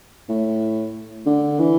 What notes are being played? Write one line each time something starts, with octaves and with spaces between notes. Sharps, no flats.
A2
D3
E3